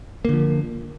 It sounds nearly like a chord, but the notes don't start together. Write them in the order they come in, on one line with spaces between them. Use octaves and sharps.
A#3 D3 F3